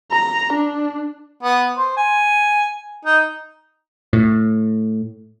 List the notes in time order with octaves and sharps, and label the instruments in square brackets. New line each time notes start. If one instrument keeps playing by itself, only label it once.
[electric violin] A#5
D4
[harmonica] B3
C5
G#5
D#4
[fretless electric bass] A2